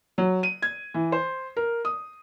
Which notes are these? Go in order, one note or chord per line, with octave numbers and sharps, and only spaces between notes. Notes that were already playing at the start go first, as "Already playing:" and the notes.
F#3
D#7
G#6
E3
C5
A#4
D#6